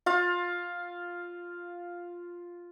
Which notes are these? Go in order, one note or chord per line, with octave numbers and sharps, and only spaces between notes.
F4 F5